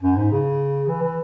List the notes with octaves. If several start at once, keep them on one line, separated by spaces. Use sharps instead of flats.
F#2
G#2
C#3
E3
E3